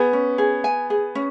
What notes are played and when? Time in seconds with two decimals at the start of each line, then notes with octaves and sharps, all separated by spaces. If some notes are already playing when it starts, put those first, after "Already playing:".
Already playing: B3 G#4
0.13 C#4
0.38 G#4
0.64 G#5
0.90 G#4
1.15 C#4